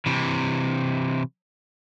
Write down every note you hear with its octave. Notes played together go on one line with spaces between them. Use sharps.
C3 E3